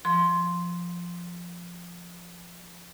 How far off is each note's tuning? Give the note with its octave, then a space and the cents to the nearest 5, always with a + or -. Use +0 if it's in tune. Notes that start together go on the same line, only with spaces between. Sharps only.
F3 +0 C6 +0